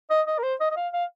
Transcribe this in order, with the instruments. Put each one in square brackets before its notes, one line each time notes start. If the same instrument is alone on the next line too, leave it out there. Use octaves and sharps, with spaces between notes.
[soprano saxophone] D#5
D#5
A#4
C5
D#5
D#5
F5
F5